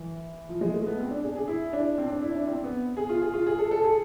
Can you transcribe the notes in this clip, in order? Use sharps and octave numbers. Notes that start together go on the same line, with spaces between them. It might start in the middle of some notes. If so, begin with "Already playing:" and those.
Already playing: E3
F3
G#3
A3
B3
C4
D4
G#4
G#4
E4
D4
C4
D4
E4
D4
C4
B3
G#4
F4
G#4
F4
G#4
A4
A4
G#4